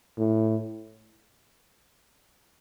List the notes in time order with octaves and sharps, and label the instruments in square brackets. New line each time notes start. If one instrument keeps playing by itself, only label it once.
[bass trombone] A2